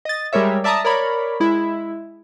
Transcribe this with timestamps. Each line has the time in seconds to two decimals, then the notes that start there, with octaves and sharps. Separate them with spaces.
0.05 D#5 A6
0.33 G3 G#3 A#4 C#5 E5
0.64 D5 E5 A5 A#5 D#6
0.85 A#4 C#5 D5 B5
1.40 G#3 E4